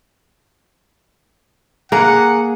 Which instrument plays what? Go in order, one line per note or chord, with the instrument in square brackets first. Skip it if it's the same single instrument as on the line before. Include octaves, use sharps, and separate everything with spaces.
[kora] A#3 [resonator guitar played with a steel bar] G#4 [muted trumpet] F#5 [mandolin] A#5